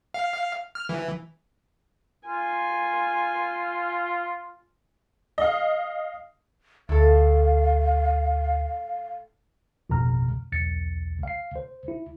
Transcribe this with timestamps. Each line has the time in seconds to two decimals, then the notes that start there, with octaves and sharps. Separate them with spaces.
0.14 F5
0.75 F6
0.89 E3
2.27 F4 G#5
5.38 D#5 F5
6.89 D2 A2 A4 F5
9.90 A1 F2 B2 A#5 F6
10.52 B1 E2 A6 C#7
11.23 F5 C7
11.56 C5
11.88 E4